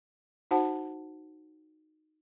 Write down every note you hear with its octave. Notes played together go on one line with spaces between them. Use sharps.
D#4 F#4 C5 F#5 A5